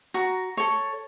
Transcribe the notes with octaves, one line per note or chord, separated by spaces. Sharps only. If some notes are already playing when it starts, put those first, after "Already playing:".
F#4 A#5
A4 C#5